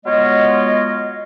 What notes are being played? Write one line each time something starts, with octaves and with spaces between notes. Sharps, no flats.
F#3 G#3 B3 F4 C#5 D#5